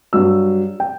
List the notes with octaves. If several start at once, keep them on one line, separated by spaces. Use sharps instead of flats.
G2 F#3 E6
G5